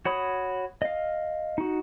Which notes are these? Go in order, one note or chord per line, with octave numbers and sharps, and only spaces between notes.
F#4 C#5 B5 D#6
D#5 F5
D#4 F#4